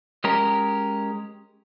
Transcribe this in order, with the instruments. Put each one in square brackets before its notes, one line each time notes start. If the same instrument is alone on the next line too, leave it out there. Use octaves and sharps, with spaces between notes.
[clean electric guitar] G#3 C#4 G4 A#4